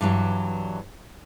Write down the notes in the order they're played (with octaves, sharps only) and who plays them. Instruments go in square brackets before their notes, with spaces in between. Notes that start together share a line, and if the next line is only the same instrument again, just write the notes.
[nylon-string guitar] G2 E3 F#3 G3